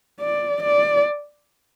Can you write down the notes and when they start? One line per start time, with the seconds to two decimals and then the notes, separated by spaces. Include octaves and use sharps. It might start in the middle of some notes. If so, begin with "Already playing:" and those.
0.21 D5
0.63 D5